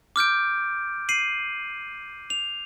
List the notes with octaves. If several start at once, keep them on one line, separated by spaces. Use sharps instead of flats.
D6 F6 G6 D7
C7 D#7 F#7
F7